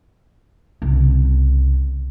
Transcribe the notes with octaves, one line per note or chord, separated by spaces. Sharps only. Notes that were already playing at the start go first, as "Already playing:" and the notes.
C2 C#3